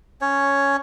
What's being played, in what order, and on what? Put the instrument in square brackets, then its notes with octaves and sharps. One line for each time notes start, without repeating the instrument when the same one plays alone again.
[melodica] C#4 C#5